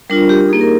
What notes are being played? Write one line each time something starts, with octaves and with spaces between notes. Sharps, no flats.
G3 D4 F4 A#4
G4
G4
A#3 D#4 G#4
A#4